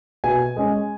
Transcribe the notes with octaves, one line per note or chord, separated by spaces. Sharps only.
B2 G#5
G#3 C#4